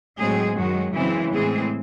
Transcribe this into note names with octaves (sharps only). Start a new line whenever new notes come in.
A2 F#3 G#3 C4 G#4
F#2 D#3 F#3 G#3 F#4
F#2 C#3 E3 G#3 C4 E4
A2 E3 G#3 C4 G#4